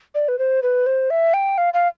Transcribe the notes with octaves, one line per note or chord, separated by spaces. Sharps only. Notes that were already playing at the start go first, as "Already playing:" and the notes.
D5
B4
C5
B4
C5
E5
G5
F5
F5